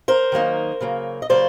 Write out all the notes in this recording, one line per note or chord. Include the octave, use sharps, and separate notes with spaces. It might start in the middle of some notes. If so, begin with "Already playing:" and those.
A#4 C5
D#3 F#3 A#3 D#4
C#3 F#3 A#3
D#5
C#3 F#3 A#3 C5 D5